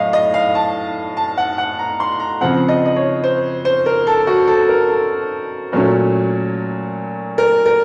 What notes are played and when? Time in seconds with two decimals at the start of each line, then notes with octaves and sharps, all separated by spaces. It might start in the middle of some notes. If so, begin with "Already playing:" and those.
Already playing: A2 F#3 D#5 F5
0.13 D#5
0.34 F5
0.55 A5
1.17 A5
1.38 F#5
1.58 F#5
1.79 A#5
2.00 C6
2.20 A#5
2.41 C#3 F3 C4 F#5
2.68 D#5
2.86 D#5
2.96 C#5
3.24 C5
3.65 C5
3.86 A#4
4.07 A4
4.27 F#4
4.48 A4
4.69 A#4
4.89 A4
5.72 A#2 F#3 A3 C#4
7.38 A#4
7.66 A#4